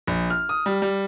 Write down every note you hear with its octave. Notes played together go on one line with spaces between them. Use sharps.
A#1
F6
D#6
G3
G3